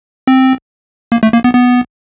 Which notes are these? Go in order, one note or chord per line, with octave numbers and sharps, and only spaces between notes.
C4
A#3
A3
A#3
B3
B3